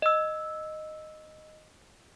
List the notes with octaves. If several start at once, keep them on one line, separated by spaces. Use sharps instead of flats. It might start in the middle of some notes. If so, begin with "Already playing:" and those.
D#5 E6